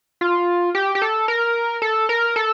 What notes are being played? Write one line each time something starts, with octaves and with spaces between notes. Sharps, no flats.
F4
G4
G4
A4
A#4
A4
A#4
A4